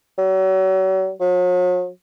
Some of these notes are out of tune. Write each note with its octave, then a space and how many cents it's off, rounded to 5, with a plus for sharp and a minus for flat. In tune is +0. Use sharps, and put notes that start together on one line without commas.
F#3 +40
F#3 -45